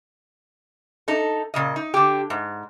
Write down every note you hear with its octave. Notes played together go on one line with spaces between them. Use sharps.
D#4 A4
A#2 C#3 D#5
D#4
D3 G4
G#2